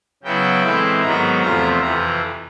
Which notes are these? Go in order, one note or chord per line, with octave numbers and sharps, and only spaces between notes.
C#3 F#3 B3 E4 G5
A2 E3 G#3 C4 E4
G#2 D#3 F#3 B3 A#5
E2 C3 F3 A3 A#5
F2 C3 E3 A#5